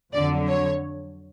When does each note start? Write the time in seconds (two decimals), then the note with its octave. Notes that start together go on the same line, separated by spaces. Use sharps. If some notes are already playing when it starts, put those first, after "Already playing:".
0.13 F2 D3 F#3 D5
0.48 C#5